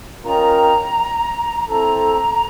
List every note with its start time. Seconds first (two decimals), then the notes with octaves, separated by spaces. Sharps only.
0.24 C#4 F4 A#4 D#5 G5 A#5
1.68 C4 E4 A4 A#5